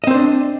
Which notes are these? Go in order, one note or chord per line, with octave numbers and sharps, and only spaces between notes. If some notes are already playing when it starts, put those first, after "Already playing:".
C4 D4 C5 D#5